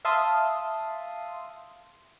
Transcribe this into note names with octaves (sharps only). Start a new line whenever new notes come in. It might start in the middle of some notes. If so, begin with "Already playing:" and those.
E5 F5 A5 C6 D#6